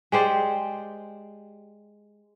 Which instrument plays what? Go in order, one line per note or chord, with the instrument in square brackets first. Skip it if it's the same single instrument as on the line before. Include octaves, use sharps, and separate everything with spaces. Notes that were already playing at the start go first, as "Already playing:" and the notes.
[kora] G#3 G4 C5 D5